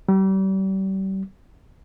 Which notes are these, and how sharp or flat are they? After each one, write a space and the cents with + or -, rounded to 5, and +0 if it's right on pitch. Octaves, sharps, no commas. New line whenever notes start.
G3 -35